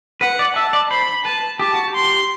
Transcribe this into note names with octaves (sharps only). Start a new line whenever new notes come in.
B4 F#5
D5
E5 A5
D5
C5 B5
B4 A5
G4 A5
F#4
G4
C6